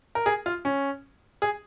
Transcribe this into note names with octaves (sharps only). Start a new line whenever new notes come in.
A#4
G#4
F4
C#4
G#4